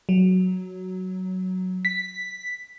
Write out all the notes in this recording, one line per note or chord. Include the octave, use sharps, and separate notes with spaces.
F#3
B6